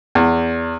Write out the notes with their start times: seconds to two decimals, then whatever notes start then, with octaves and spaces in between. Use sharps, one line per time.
0.15 E2